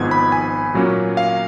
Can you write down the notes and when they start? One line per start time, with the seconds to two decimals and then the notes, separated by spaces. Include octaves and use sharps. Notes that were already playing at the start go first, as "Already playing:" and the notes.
Already playing: G#1 G#2 F3 B3 G#6
0.11 B5
0.32 G#5
0.74 A#2 F#3 A#3 C#4
1.17 F5